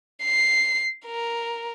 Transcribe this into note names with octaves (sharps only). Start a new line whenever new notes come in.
C7
A#4